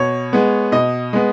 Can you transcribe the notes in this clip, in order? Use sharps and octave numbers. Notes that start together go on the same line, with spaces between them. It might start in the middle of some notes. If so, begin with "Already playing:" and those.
Already playing: B2 C#5
G#3 B3
B2 D#5
G#3 B3